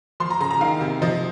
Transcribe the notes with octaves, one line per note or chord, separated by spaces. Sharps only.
F3 C6
A#5
C#3 A#5
A#5
D#3 F5
C3
F3 D#5